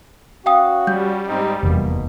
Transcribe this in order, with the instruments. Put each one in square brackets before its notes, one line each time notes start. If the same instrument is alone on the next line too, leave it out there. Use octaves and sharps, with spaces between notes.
[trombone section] C#4 F#4 [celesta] F5 G5 D#6
[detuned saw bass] G3 [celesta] G6
[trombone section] G#2 C4 D#4
[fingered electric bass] F1 E2 [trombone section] G#2 B2 A#3